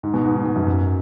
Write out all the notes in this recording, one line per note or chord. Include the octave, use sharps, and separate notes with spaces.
G#2
B2
G#2
G#2
B2
F#2
F#2